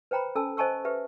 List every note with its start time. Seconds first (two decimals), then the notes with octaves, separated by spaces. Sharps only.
0.11 B4 C5 G5 A#5 B5
0.35 C#4 A4 G#5 A5 E6
0.57 C5 D#5 G#5 A5 C#6 E6
0.85 G4 B4 E5